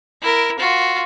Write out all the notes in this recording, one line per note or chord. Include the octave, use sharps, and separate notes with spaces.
E4 A#4
F4 F#4